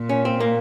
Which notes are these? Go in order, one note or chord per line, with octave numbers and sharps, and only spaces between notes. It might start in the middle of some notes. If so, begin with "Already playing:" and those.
Already playing: A#2
C#4
C4
A#3